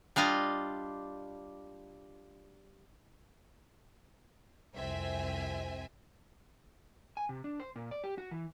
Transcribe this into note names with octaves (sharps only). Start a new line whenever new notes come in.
G3 D4 F4 D#5
C2 F2 C4 E5 G#5
G#5
C3
D4
C5
A#2
D5
G4
F#4
E3